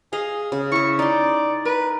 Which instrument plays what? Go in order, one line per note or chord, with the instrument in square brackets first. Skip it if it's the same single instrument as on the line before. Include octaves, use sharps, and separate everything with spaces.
[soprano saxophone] G#4 [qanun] D#5 F5
[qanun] C#3
[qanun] E4 E5 [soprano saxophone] C#6
[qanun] D#4 C6 [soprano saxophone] D5
[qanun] A#4 [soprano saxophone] B4